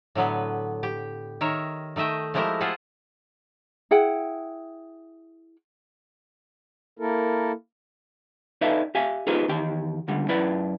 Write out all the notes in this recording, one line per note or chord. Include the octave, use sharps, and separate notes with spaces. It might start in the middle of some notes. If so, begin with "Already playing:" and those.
A2 D3 F#3 B3 B4
G4
D#3 A#4 C#5 E5
D#3 A3 D#5 E5 G5
F3 G#3 A3 E4 G4 A#4
F4 G#4 A4 C5 E5 F#5
E4 G#4 F#5 G5
A#3 E4 A4 A#4
D#4 A4 B4 D5 E5 F5
G4 E5 F5 G#5
D#4 F4 G4 G#4 B4 C5
E2 D#3 G4 G5
C#2 D3 G3
F#2 E4 B4 D5